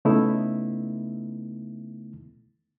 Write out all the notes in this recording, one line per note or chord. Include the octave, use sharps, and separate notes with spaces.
C#3 A3 B3 D#4 E4